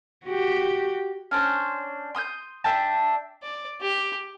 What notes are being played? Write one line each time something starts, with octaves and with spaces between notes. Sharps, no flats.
F#4 G4
C#4 D4 C5
C6 D#6 E6 G6
D4 E5 G5 A5
D5
G4